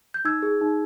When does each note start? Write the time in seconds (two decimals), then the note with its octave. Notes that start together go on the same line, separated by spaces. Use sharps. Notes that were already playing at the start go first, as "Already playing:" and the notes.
0.14 G6
0.25 D#4 E6 G#6
0.42 G#4
0.61 D#4